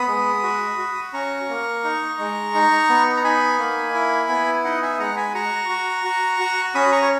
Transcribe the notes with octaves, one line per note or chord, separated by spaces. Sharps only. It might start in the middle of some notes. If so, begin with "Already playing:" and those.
Already playing: B3 B5 D#6
G#3
F#4
F#4
C#4 A#5 C#6
A#3
D#4
G#3
D#4
B3
A#5
D#4 G#5 B5
A#3
E4
B3
D#4 D#5 F#5
E5 G#5
G#3 F#5 A#5
G#5 B5
F#4 A#5 C#6
F#4
F#4
F#4
C#4 B5 D#6
A#5 C#6
C#5